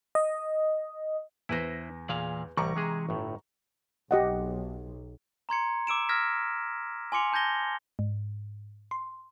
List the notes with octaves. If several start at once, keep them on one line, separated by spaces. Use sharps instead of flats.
D#5
E2 E4 B4 C5 A#6
A#2 E3 G#4 F5
C2 A2 E3 G3 A#5 C#6
C3 G#3 G#4
G1 A2
B1 G4 D#5 F#5
A#5 C6 G#6 C#7
D6 E6 D7 E7
E6 F6 G#6 A#6 B6
G#5 C6 D6 C#7 F7
A5 G6 G#6 A#6 G7
G#2
C6